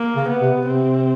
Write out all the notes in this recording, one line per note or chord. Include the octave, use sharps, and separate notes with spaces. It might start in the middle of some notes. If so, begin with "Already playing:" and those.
Already playing: A#3
C#3
B3
C3
C3 C4